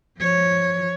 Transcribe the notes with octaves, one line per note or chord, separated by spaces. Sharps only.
F3 C#5